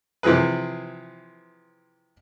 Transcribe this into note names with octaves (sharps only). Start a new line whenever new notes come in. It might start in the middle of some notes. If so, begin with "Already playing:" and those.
C3 E3 F3 G#4 B4